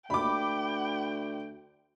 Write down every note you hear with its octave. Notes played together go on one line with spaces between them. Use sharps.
D2 G5 B5 D6